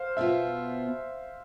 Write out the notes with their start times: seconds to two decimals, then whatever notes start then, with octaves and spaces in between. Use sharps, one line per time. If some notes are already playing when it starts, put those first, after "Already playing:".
Already playing: C5 F5
0.17 B2 B3 F4 E5